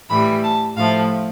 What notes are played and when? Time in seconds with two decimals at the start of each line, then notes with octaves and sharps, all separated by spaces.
0.10 A2 E3 G3 B5
0.44 A5
0.77 A2 F3 A3 F5